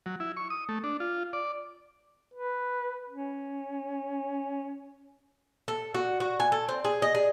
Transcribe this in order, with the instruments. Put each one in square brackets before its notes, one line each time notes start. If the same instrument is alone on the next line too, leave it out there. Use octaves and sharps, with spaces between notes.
[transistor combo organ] F#3
E4
C#6
D#6
A3
D4
F4
D5
[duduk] B4
C#4
[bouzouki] A4
F#4
F#4
G#5
A4
C4
G#4
D#5
G#4